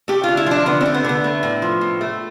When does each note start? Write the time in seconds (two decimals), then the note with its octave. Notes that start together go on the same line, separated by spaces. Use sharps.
0.08 A3 G4
0.23 D3 F4
0.37 E4
0.46 F3 D4
0.66 D3 B3
0.81 C4
0.86 A3
0.94 B3
1.04 D3 B3
1.24 A3
1.43 A2
1.62 F3
1.81 A2
2.01 A3